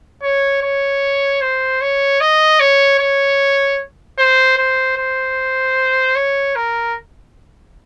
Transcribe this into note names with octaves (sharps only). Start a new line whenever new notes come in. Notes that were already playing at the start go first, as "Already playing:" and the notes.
C#5
C#5
C5
C#5
D#5
C#5
C#5
C5
C5
C5
C#5
A#4